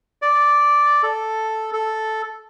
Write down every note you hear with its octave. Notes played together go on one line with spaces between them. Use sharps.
D5
A4
A4